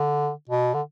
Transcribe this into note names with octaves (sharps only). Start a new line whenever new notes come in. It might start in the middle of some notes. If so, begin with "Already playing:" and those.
Already playing: D3
B2
D3